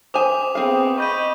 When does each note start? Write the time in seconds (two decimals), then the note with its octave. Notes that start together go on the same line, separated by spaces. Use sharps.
0.14 C5 G#5 D6 D#6 F7
0.55 B3 C4 G#4 F5
0.98 D#5 B5 C#6 G6 D#7